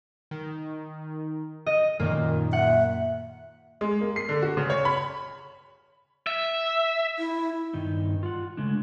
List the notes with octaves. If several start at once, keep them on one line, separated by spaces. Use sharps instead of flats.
D#3
D#5
F#2 A#2 D#3 A#3
E5 F#5
G#3
A#3
C7
D3
F#4
C#3
C#5
B5
E5
E4
G2 D#3 D#4
F4 F#5
C#3 G#3 A3 D4